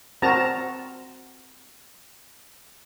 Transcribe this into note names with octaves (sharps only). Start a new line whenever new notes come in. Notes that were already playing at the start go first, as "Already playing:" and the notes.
C4 F#4 A#4 A5 A#5